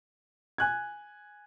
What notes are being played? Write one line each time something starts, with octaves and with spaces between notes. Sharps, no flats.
G#5 F#6 G#6